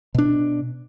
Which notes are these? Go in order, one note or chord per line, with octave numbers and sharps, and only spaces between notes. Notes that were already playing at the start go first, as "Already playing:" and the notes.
B2 D4